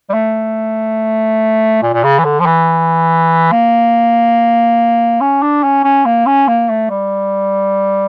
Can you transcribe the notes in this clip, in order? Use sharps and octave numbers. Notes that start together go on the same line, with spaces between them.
G3
A3
A#2
A#2
C#3
E3
D3
F3
E3
A#3
C#4
D4
C#4
C#4
A#3
C#4
A#3
A3
G3